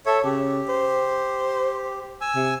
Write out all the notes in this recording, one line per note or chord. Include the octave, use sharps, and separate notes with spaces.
A4 C#5 E5
C#3 G4
C5
G#5 E6
C3